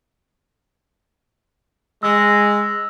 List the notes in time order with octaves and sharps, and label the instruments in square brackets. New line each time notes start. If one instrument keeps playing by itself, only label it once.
[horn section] G#3 [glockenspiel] E6 A#6